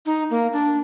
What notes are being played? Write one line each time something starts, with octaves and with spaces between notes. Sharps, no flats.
D#4
A#3
D4